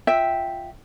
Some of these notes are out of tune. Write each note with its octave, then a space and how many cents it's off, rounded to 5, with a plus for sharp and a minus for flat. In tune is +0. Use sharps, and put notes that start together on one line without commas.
F4 +0 E5 -5 G5 +0